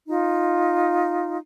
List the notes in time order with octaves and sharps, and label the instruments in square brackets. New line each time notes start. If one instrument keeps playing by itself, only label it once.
[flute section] D#4 F4